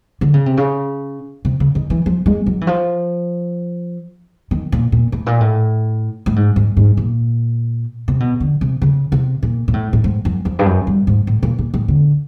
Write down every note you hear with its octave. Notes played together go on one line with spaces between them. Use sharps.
D3
C#3
C3
C#3
C3
C#3
D#3
E3
F3
G#3
F#3
E3
F3
D#3
A#2
A#2
A2
A#2
A2
A2
G#2
G#2
G#2
A#2
C3
B2
D3
C3
C#3
C3
A#2
A#2
A2
A2
G#2
F#2
F2
G2
F#2
G2
G#2
A2
A#2
A#2
A2
D3